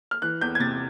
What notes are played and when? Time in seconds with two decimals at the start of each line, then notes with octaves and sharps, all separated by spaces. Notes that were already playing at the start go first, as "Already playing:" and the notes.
0.11 F6
0.22 E3 F#6
0.41 E2 G6
0.55 G#6
0.60 C3 A6